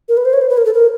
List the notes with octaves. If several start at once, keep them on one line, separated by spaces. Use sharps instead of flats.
A#4
B4
C5
C#5
C5
B4
A#4
A4
A#4